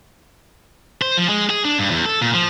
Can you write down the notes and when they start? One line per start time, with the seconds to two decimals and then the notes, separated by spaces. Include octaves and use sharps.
1.02 C5
1.17 F3
1.29 G#3
1.50 G#4
1.65 D4
1.79 G2
1.91 E2
2.06 A4
2.21 A#2
2.34 F3